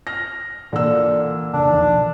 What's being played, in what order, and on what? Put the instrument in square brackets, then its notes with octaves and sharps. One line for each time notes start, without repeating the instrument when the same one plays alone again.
[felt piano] F6 A#6
[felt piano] A#2 A#3 E6 [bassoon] D3 [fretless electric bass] E3
[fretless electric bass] F1 C#3 [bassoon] D4
[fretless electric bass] B1 E2 F3 [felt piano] D#3